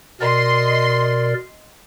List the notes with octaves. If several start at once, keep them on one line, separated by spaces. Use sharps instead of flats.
B2 A#4 D5 D#5 C6